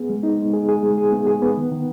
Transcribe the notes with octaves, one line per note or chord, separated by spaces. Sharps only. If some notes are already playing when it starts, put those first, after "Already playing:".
Already playing: B3 G#4
G#3
D#4
G#3
G#4
G#4
G#3
G#4
B3
G#4
B3
D#3
D#3